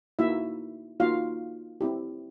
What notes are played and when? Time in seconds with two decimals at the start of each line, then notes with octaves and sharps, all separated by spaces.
0.19 A#3 D#4 E4 F#4 E5
1.00 A#3 D#4 F4 F#4 F5
1.81 C4 E4 G4